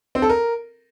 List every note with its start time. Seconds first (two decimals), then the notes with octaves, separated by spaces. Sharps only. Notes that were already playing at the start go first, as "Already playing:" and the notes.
0.15 C4
0.22 A4
0.29 A#4